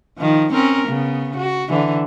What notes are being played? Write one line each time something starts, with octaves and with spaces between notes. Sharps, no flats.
D#3 F3
C4 C#4 A#4
C#3 B3
F#4
D3 E3